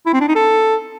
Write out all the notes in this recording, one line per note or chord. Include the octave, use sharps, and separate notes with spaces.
E4
C4
D4
D#4
A4